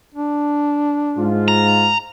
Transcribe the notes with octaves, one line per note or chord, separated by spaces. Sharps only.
D4
G#2 F4
A#5